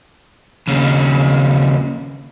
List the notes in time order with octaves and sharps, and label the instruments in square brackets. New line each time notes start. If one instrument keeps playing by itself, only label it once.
[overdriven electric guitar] D#2 C#3